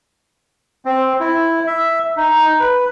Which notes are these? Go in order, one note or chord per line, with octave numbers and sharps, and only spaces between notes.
C4
E4
E5
D#4
B4